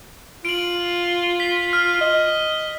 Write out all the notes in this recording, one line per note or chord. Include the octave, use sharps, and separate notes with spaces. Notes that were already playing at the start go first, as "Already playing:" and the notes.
F4 D7 F#7
B6
F6
D#5